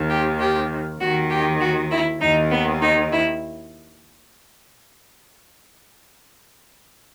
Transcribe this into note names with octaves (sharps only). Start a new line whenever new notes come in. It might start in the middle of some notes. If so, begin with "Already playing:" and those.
Already playing: D#2 D#3
G4
G4
D#2 D#3 F#4
G4
F#4
E4
D#2 D#3 D#4
B3
D#4
E4